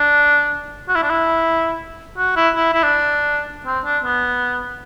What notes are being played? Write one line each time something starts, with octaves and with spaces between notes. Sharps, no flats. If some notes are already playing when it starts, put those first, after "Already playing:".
Already playing: D4
F#4
E4
D4
E4
F#4
E4
E4
E4
D4
C4
D4
B3